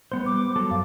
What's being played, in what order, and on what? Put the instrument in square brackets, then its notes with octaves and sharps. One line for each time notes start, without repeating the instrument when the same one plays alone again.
[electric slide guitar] G3 B3 C5
[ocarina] D6
[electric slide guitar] F#3 A4
[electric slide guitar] F#2 [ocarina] F5